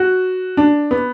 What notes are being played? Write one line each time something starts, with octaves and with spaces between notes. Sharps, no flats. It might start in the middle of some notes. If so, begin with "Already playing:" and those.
Already playing: F#4
D4
B3